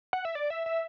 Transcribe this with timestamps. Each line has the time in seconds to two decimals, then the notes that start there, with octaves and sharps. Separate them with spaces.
0.13 F#5
0.25 E5
0.35 D5
0.50 E5
0.66 E5